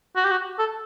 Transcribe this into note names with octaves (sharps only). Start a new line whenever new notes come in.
F#4
G4
F#4
A4